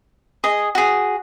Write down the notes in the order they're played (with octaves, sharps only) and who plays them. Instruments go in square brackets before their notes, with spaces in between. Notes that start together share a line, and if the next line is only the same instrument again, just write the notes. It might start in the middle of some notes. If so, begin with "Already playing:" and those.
[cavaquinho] G#4 D#5
F#4 G#4